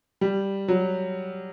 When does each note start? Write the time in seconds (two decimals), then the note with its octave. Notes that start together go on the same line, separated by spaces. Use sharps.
0.21 G3
0.68 F#3